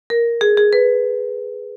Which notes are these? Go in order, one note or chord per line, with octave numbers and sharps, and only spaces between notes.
A#4
G#4
G#4
B4